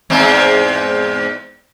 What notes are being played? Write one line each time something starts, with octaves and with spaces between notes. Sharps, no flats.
E2 G#2 C4